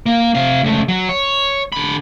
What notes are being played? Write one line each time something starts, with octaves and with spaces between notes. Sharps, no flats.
A#3
C3 F5
C#2 A3
F#3
C#5
D3 B5